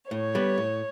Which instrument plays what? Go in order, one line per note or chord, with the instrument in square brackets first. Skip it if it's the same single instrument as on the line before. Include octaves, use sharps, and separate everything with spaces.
[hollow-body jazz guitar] A2 [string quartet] C#5
[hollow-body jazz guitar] G3 B3
A2